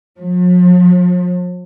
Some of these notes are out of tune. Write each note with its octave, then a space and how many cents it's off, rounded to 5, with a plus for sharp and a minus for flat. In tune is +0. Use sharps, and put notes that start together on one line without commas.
F3 +45